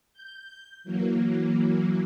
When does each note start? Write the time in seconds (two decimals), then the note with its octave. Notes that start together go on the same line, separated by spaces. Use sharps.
0.13 G6
0.84 E3 F#3 A#3